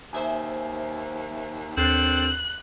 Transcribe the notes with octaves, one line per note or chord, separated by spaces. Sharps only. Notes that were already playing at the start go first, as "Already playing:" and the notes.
D#2 C5 E5 G#5
D#2 D3 C4 F#6 A6 C7